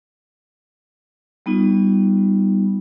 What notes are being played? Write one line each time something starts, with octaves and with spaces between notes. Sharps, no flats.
G3 B3 D#4 F4